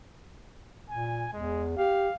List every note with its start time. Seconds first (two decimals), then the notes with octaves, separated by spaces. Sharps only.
0.89 A#2 G#5
1.33 E2 G#3
1.77 G4 F5